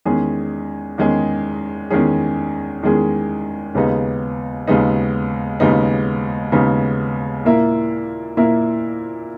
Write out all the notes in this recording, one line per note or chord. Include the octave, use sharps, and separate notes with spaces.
E2 D#3 G#3 C#4 G#4
E2 D#3 G#3 C#4 G#4
E2 D#3 G#3 C#4 G#4
E2 D#3 G#3 C#4 G#4
D#2 C#3 G#3 B3 D#4
D#2 C#3 G#3 B3 D#4
D#2 C#3 G#3 B3 D#4
D#2 C#3 G#3 B3 D#4
A#2 A#3 E4 A#4 E5
A#2 A#3 E4 A#4 E5